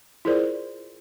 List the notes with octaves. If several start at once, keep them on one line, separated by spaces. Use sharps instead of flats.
E4 F4 G#4 A#4 C5 D5